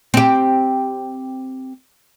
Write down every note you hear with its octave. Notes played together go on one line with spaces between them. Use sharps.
C4 G4